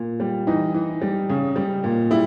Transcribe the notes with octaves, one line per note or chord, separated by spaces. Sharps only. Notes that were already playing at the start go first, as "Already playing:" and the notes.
Already playing: A#2
G3
E3 D#4
E3
G3
C#3
G3
A#2
G3 E4